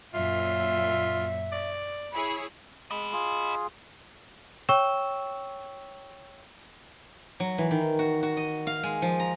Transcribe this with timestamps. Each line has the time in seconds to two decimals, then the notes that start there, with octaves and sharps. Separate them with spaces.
0.14 F#2 A#2 F4 E5
1.52 D5
2.12 E4 G#4 C#5 B5
2.91 G#3 D#5 B5
3.12 F4 G#4
4.69 C#5 G5 C#6 E6 E7 G7
7.40 F#3
7.58 E3
7.71 D#3
7.99 F#4
8.23 F#4
8.37 D#5
8.67 F5
8.83 G#3
9.02 F3
9.20 A#5